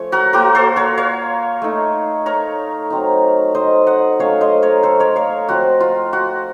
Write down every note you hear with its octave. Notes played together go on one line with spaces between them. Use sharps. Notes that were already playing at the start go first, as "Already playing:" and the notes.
Already playing: F3 A3 C#4 C#5
F#4 A#4
A#3 F4 F#4 A#4
A4 C5
A#4 C#5
C#5 F5
A3 D#4
A#4 C#5
F#3 C4 D#4
C5 D#5
D#5 F#5
F#3 A3 C#4 C#5 F5
C5 D#5
A#4 C#5
A4 C5
A#4 C#5
C#5 F5
F3 C4 F4 F#4
F4
F#4